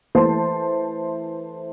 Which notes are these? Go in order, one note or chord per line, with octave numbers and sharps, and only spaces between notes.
E3 A3 C5 A5 C6